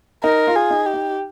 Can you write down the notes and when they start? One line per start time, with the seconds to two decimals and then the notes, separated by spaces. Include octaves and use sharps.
0.24 D#4 A#4
0.47 F4
0.55 G#4
0.70 D#4
0.86 G4
0.94 D#4